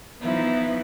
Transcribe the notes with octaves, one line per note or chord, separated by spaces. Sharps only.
E3 F3 B3 D#4 E4